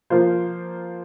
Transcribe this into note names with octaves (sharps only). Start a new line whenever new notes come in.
F3 A#3 F4 C5